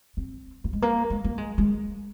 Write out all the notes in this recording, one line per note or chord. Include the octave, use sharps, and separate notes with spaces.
C4
A#3
G#3
A#3
G#3
A#3
G#3
G#3